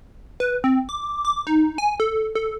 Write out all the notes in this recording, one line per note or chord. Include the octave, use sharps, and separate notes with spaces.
B4
C4
D6
D6
D#4
G#5
A4
A4